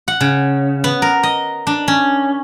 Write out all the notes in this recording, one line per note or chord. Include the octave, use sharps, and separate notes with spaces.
F#5
C#3
B3
A#4
D#5
D4
C#4